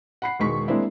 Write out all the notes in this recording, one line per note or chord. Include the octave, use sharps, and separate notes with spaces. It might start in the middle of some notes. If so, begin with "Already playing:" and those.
F#5 B5 C7
E1 D#3 G#3 C#6 B6
G#3 A#3 C4 D4 E4